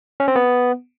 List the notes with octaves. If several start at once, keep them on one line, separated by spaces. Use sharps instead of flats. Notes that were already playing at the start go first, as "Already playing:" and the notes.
C#4
C4
B3